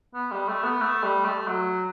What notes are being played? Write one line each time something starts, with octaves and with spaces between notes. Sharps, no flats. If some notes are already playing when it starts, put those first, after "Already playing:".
B3
G3
A3
B3
A3
G3
A3
F#3